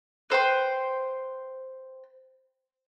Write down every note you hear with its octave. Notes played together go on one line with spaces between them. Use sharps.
B4 C5 G5 C6